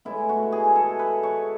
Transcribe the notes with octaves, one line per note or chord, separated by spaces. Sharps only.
A2 G#3 B3 E4
F#4
G#4
A4
B4
C#5